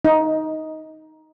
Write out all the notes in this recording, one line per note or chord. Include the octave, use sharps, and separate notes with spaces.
D#4